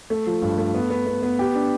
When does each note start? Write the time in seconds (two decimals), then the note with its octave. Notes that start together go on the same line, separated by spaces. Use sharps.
0.10 A3
0.27 F3
0.42 G2
0.58 A3
0.75 B3
0.90 B3
1.07 B3
1.23 B3
1.39 G4
1.55 D4